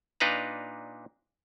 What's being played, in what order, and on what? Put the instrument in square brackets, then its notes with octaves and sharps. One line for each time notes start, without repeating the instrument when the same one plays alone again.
[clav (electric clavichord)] A#2 D4 D#4 B4 F5 A#5